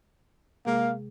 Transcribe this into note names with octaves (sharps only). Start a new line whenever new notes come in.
C3 G#3 A#3 G#4 F5